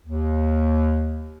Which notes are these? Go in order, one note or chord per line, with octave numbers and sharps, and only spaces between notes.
D#2